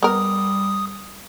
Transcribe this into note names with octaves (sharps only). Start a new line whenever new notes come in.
G3 B3 A#4 D#6